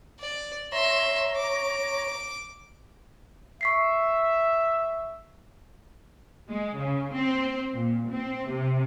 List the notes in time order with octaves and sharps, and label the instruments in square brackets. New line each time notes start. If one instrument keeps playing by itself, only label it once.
[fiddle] D5
[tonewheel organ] C#5 A#5 [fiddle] E5 C6
[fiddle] D6
[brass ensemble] E5 [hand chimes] C#6 B6 C7
[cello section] G#3
C#3
C4
A#2
C4
C3